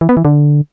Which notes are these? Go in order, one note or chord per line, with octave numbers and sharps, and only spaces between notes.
E3
B3
E3
D3